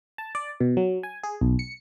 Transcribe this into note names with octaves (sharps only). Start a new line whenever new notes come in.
A5
D5
B2
F#3
G#5
G#4
B1
C#7